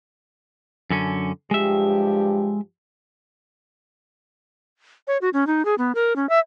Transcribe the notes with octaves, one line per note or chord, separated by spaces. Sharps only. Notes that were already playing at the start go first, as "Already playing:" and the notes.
F#2 D3 C#4
G2 F3 G#3 G4 E5
C#5
F#4
C#4
D#4
G#4
B3
A#4
C#4
E5